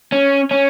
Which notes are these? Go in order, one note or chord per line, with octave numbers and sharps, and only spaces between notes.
C#4
C#4